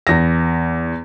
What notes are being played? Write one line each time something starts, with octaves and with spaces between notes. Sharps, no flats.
E2 A#6